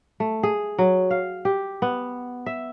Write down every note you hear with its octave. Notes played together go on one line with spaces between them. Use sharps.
A3
G#4
F#3
F5
G4
B3
E5